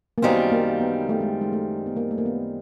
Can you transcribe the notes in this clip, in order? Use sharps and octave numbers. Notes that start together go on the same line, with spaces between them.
A#3
F#2 D#3 G3 B3 C4 F4
A#3
B3
A3
G#3
G#3
A3
B3
A#3
A3
A#3
B3